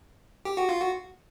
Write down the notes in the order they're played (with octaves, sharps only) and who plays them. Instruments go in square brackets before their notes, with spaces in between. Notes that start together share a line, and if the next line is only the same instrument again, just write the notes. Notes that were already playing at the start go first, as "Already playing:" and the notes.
[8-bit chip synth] G4
F#4
F4
F#4